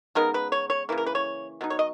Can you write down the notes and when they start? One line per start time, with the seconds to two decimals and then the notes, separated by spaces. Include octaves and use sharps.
0.15 C#3 G#3 B3 D#4 A#4
0.34 B4
0.52 C#5
0.70 C#5
0.89 C#3 E3 A#3
0.98 A#4
1.06 B4
1.15 C#5
1.61 B2 F#3 D#4
1.70 C#5
1.79 D#5